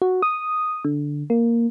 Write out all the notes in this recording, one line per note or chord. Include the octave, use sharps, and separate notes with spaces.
F#4
D#6
D3
A#3